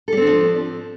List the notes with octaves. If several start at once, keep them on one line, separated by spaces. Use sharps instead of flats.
F3 G3 C4 D4 A4